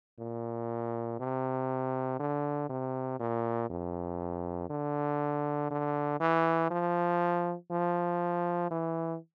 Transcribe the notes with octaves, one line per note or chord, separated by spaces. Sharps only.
A#2
C3
D3
C3
A#2
F2
D3
D3
E3
F3
F3
E3